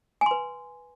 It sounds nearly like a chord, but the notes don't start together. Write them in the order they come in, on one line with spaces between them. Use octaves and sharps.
G#5 C6 B4